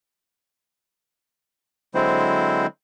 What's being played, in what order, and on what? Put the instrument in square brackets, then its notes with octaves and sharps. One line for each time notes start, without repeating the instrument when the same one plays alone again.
[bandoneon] D3 F#3 G#3 C4 E4 C5